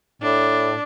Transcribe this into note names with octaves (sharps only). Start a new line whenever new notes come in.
A2 D4